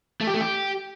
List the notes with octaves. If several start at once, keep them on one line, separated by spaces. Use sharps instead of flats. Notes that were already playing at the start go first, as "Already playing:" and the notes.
A3
G4
A3
G4